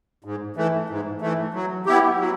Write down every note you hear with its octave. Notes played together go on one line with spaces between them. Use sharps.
G#2
E3 A3
G#2
E3 A3
F#3
B3 E4 G4
F#3